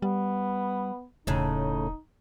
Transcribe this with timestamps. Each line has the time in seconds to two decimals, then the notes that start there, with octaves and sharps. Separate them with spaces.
0.02 G3 B3
1.27 E1 A2 C#3 D#4